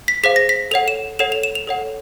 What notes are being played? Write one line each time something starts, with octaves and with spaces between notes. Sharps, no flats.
B6
G#4 C5 F5 B6
A#6
B6
A4 C#5 F#5 F7
E7
A4 C#5 F#5 E7
F7
E7
F7
A4 C#5 F#5